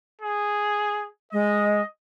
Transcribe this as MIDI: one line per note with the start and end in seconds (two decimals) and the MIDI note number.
0.22 1.08 68
1.33 1.81 56
1.33 1.86 75